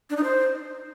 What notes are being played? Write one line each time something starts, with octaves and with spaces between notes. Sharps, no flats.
D4
D#4
C5